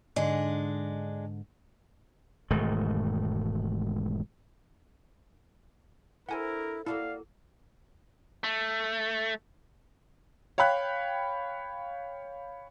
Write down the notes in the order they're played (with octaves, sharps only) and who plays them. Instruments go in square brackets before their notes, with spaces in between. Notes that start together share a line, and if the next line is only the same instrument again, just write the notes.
[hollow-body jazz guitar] G#2 D3 [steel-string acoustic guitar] G#3 D4
[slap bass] E1 G#2 D#3 A3
[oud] D4 A4 C5 [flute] E4 [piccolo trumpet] A#4 [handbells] F#5 G#5
[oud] A#3 F#4 A4 [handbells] E4 [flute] D5 [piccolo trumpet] F5
[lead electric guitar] A3
[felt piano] C#5 F5 G5 B5 F#6